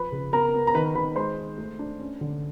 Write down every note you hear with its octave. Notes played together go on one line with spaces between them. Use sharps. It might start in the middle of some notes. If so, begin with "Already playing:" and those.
Already playing: F3 B4 B5
C#3
B3 A#4 A#5
B3
A#5
D#3 B4 B5
D#3 B4 B5
G#3 C5 C6
D#4
A3
D4
C#4
D3